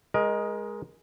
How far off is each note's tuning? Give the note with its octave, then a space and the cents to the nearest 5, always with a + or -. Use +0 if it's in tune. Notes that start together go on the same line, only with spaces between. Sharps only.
G#3 +0 A#4 +25 D#5 +0